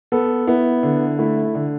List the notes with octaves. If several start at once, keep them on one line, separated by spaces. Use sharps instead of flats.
B3 A4
B3 E4
D3
A3 E4
E4
D3